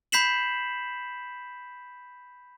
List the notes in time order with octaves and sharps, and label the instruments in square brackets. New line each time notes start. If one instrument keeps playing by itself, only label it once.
[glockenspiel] B5 G6 B6 C7 E7 F#7